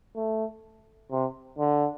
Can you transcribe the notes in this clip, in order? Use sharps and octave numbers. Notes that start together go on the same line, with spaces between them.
A3
C3
D3